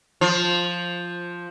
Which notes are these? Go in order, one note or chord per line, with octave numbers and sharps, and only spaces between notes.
F3